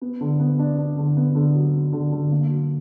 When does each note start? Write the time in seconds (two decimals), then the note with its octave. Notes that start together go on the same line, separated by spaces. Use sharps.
0.01 B3
0.21 D3
0.40 B3
0.59 D4
0.78 D4
0.98 D3
1.17 B3
1.35 D3
1.55 F#3
1.74 F#3
1.93 D3
2.12 D3
2.32 A#3
2.50 F#3